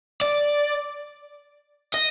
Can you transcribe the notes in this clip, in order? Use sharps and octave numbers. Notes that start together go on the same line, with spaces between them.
D5
D#5